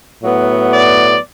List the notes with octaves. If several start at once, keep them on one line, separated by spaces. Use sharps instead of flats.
A2 F#3 B3
D5